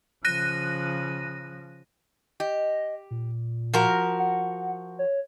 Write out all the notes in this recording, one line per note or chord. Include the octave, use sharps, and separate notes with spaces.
C#3 F3 F#6 A#6 D#7
G4 D#5
A#2
F3 F#4 A#4
F#5
C#5